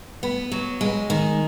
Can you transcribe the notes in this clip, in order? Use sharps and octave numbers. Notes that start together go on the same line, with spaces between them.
B3
F#3
G#3
D#3